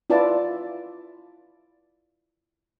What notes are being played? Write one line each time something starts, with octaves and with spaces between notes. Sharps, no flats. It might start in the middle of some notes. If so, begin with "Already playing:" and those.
E4 F4 B4 D5 A5